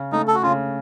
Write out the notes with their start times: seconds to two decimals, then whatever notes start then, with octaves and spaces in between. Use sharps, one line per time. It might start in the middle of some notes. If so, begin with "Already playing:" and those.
Already playing: C#3
0.12 A3 D#4
0.28 A4
0.35 F#4
0.43 C#3 F4